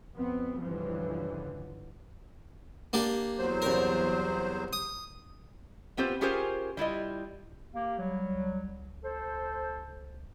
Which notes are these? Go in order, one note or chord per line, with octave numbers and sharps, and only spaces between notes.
F2 B3 C4
C#2 G2 D3 E3 F3
A#3 D4 G4
E2 F#3 C5
C2 A#4
D#6
B3 C4 F4 G4 C5
C#4 F4 G4 G#4 A#4 C5
G3 E4 F4 D#5
A#3 G4
F#3 G3
C#2
A4 C5